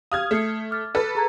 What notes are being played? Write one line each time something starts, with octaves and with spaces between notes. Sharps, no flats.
G4 F5 D#6 F6 G#6
A3 D#6 C7 C#7
D6 F6 A6
A4 B4
G#4 A#5 G#6